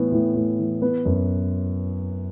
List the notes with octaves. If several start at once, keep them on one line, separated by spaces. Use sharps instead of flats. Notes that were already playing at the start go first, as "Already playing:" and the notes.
Already playing: A2 E3 B3
A2
A2
E3
B3 B4
F#2